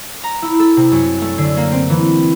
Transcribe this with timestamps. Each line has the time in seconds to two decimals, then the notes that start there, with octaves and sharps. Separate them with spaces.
0.23 A#5
0.42 E4
0.59 A4
0.77 C3
0.92 F#2
1.21 A3
1.38 D3
1.57 A#3
1.72 C4
1.90 E3